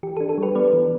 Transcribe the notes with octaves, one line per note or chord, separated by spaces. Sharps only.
E3 G4
A4
D4
A4
G3 G4 B4
B3 B4 D5
E3